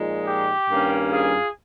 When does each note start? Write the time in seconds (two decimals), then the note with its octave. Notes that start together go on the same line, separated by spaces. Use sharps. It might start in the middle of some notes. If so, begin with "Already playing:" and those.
Already playing: A#2 F3 G#3 D#4
0.27 G4
0.69 G2 D#3 A#3 C#4
1.11 F4 G#4